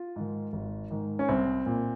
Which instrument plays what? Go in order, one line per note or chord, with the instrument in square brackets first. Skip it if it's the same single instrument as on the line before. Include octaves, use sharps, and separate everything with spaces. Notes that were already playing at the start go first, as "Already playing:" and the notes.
Already playing: [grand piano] F4
G#2 D#3
G#1
G#2 D#3
C#4
C2 C4
A#2